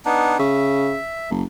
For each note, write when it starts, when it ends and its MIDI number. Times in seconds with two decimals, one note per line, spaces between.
0.05 0.38 59
0.05 0.38 62
0.05 0.38 63
0.39 0.98 49
0.39 1.30 76
1.30 1.43 30